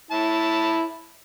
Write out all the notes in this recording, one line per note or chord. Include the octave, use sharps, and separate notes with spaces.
E4 A5